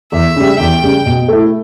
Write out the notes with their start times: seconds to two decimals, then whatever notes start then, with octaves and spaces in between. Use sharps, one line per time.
0.12 E2 E5
0.36 C#3 G3
0.59 E2 G5
0.83 C#3 G3
1.06 B2
1.28 A3 E4